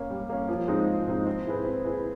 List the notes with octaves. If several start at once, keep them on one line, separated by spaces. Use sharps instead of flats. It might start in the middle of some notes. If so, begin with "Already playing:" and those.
Already playing: A#3 C#4
G3
A#3 C#4
F3
G#3 C4 D#4
F3
G#3 C4 D#4
C4
E4 G#4 B4
C4
E4 G#4 B4